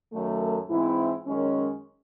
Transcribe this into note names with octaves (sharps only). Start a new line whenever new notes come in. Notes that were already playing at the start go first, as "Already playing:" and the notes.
F#2 D#3 F#3 A3
G#2 E3 C4 E4
F#2 D#3 G#3 C#4